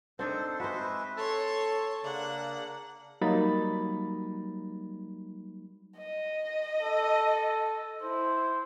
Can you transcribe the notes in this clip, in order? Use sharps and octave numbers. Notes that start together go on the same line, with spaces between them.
C4 D4 D#4 A4 C5
G#3 F#4 B4 C5 E5
A4 C#5 A5 C6
C#3 A#3 D4 F#5
F#3 G3 A#3 D#4 B5 A6
D#5
A4
E4 C5